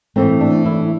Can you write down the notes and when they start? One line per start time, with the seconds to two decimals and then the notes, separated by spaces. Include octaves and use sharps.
0.16 A2 E3 A3 C4
0.40 D4
0.65 E4